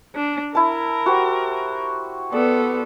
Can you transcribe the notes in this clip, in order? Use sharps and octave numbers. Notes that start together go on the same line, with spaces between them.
D4
E4 A#4 A5
F#4 G4 C5
B3 A4 D5